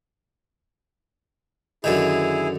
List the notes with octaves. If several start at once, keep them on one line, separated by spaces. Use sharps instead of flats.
F#2 D3 D#3 E4 G#4